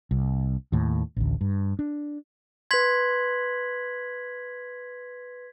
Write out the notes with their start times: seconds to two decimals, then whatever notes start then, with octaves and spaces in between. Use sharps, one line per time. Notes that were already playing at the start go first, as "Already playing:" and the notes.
0.11 C2
0.72 D#2 A2
1.17 A1 D2
1.41 G2
1.79 D4
2.71 B4 C6 G#6 B6 F#7